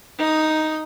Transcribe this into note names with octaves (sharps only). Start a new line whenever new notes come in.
D#4 D#6